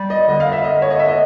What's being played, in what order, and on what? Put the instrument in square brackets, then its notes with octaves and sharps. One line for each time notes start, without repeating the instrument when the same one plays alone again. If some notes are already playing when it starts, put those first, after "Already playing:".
Already playing: [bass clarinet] G3
[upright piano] D#5
[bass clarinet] D3 [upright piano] D#5
[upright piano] F5
E5
D#5
C#5
D#5
E5
D#5